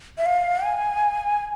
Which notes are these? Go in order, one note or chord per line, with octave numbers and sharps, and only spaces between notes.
E5
F5
G#5